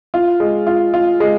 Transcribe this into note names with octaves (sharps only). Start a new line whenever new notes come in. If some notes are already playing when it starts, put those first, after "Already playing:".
F4
G#3
F4
F4
G#3